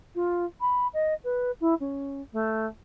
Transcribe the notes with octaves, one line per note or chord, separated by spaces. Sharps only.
F4
B5
D#5
B4
E4
C#4
A3